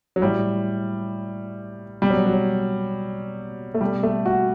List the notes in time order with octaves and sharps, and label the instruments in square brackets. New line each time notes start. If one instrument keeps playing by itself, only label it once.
[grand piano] F#3
A2 E3 G3
B2 G3
F#3
F#3
A3
B2 G3
A3
F#4